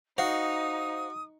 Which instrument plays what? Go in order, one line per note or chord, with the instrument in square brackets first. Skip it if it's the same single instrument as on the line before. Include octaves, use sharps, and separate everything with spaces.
[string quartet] D#4 [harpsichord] F#4 [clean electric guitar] C5 F5 [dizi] D#6